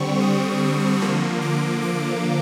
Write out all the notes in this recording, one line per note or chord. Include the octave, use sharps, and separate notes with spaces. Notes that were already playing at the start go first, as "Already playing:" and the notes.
Already playing: D3 G3 C4 C#6
D#6
D3 F3 A#3
D6
D6